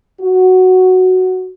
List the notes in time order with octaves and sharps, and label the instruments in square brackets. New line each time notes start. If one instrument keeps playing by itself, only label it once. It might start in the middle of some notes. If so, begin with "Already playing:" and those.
[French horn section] F#4